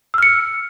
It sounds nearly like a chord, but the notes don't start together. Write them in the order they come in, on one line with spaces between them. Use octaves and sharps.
E6 F6 C#7